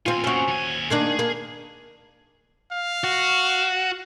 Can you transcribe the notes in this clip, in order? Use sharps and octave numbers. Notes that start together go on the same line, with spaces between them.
D#2 C4 F4 G#5
A#2 C4 C#4 F#4
D#2 G#5
D#3 A#3 D4 G#4
A#3
F5
F#4